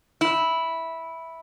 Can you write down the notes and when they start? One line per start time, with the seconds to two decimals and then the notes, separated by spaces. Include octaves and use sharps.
0.21 E4